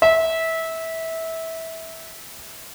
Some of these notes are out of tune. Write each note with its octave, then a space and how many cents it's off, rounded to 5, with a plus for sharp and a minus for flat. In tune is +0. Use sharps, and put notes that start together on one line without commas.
E5 -20